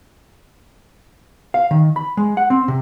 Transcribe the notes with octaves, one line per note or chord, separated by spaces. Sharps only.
F5
D#3
B5
G#3
F#5
C4
C3